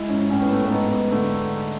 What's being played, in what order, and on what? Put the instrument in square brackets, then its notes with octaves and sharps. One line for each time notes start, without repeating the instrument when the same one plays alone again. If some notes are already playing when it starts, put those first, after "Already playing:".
Already playing: [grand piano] G#3 E4
G#2 C#4
A2 C#4
B3
A2 A3
G#2 B3
G#2
D3 A3